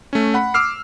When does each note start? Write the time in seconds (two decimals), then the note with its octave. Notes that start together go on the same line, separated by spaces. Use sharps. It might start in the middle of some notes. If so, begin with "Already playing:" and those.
0.13 A3 C#4
0.34 F#5 B5
0.54 D6 E6 F6 C7